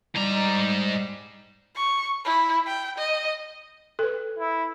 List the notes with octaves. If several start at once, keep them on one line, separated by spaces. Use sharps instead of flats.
G#2 G3 A#5
C#6
E4
G5
D#5
A4 B4
E4